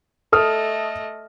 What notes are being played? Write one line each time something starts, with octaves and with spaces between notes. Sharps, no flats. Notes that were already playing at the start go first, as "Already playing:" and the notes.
A3 A4 D#5 D#6 F6